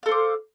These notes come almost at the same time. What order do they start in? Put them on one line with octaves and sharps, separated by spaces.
F5 A4 C5 D6